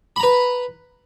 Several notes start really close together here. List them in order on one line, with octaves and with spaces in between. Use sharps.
B5 A#5 B4